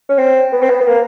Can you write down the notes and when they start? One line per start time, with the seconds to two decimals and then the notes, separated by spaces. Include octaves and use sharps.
0.09 C#4
0.18 C4
0.52 B3
0.62 C4
0.69 B3
0.80 B3
0.87 A#3